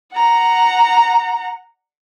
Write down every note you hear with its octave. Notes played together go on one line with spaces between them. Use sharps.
F#5 A#5